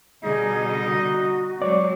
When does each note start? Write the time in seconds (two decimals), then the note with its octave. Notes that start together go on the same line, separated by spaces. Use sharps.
0.24 B2 D3 G3 D#4 G#4 D#5
0.84 F#4
1.62 F#3 G#3 C4 C#5 D5